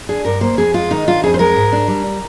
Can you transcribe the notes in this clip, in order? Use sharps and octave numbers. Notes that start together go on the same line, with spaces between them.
D4 G#4
G2 A#4
A#3 C5
F2 G#4
G#3 F4
D#3 D#4
D4 F4
F2 G#4
C5
G#3 A#4
G#2
D4
G3